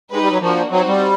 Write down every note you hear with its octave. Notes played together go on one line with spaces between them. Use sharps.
G#3 D#4 G4 B4
G3
F#3
F3 A#3 D4 F#4
F#3 C4 D#4 F#4
G3